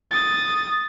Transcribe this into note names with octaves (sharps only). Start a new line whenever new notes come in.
D#6 A6